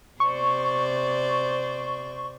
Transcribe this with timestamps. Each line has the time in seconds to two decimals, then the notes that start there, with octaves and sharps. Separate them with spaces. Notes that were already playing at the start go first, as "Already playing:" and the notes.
0.20 C3 C5 D5 C#6